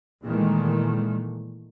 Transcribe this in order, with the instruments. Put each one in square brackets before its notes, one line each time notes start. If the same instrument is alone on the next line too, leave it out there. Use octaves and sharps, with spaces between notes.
[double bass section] A#2 D#3 E3 G#3 A3